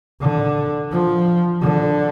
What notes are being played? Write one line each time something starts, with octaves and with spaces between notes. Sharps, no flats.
D3
F3
D3